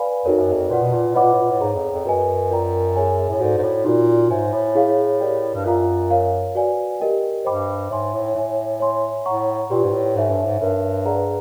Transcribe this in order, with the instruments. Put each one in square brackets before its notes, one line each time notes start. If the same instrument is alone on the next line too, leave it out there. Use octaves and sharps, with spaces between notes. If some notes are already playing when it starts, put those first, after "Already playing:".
Already playing: [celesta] B4 D5 F5 G#5 B5
[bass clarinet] F2 [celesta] D#4 F#4 A#4 C#5
[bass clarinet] F#2
F2
[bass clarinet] A#2 [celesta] B4 D5 F#5
[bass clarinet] B2
A#2
[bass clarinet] A2 [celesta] B4 D#5 F#5 B5 D6
[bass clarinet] A#2
A2
A#2
A2
[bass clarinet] G#2 [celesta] G#4 C#5 F5 A#5
[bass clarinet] F2
F2
[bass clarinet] F#2 [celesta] F#4 B4 D#5 G#5
[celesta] F4 A#4 D5 G5 A#5
G#4 C#5 E5 G#5
[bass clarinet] A2
[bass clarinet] G#2 [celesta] F#4 A4 D5
[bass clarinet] G#2
A2
[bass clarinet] A#2 [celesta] D#4 F#4 A#4 D5
[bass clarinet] G#2 [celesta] C#5 E5 G#5
[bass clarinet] A2
[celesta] E4 G#4 C#5 F5
G4 A#4 D5 G5
[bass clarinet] G2
[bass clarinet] F#2 [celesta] F4 A#4 D5 F5 A#5
[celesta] A#4 C#5 F5
F#4 B4 D5 F5 G#5
G4 A#4 D#5 G5
[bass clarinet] G2 [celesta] C5 D#5 G5 B5 D6
[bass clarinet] G#2 [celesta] C#5 E5 G#5 C6
[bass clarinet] A2
[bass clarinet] A2 [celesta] C#5 E5 G#5
[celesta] C#5 E5 G#5 C6
[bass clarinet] A2 [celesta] C#5 F#5 A#5 C#6
[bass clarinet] A#2 [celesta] G4 B4 D5 G5 C6
[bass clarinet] G#2
A2
[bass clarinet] G#2 [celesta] A4 C#5 E5 G#5
[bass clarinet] G2
G#2
[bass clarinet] G2 [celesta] A#4 C#5 E5
[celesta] G#4 B4 D5 F#5 A#5